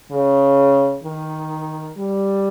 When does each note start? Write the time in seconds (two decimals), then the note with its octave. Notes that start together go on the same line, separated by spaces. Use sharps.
0.12 C#3
1.04 D#3
1.98 G3